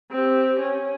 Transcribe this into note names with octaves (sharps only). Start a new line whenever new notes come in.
C4 G4
C#4